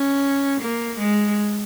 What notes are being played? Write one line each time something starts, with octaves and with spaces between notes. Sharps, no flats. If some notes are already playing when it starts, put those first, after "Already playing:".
Already playing: C#4
A#3
G#3